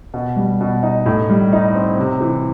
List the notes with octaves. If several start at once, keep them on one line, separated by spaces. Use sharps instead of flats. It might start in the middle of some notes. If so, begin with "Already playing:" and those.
B2
G3
B2
D#4
A2
G3
D#4
C4
C3
E3